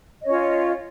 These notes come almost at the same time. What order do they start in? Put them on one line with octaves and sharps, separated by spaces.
D#5 C#5 C#4 F4